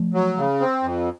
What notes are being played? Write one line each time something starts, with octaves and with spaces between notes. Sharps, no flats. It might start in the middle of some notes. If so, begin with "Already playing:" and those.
Already playing: F3 A3
F#3
C#3
C4
F2